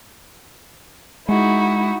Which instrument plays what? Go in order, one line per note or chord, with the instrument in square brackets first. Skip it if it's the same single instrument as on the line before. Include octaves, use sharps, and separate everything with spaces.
[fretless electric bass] G#3 [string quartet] D#4 E4 F#4